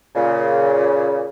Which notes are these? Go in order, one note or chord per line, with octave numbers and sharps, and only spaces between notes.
A#2 C#3